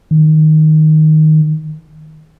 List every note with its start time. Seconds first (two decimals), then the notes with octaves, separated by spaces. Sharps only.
0.11 D#3